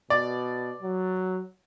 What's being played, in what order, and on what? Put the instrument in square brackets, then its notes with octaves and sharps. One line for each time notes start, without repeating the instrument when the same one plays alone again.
[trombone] B2 [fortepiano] D5
[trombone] F#3